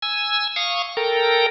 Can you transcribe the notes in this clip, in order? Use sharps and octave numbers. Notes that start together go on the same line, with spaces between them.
G#5 E6
F5 C#6 D#6
A4 A#4 G5 A#5